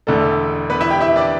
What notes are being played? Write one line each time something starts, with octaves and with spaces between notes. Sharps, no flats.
E1 E2 D3 A3 A4
B3 B4
E4 E5
G4 G5
E4 E5
D4 D5